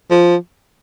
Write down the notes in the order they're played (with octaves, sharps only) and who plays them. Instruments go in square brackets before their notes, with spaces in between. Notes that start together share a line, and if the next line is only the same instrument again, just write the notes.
[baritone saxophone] F3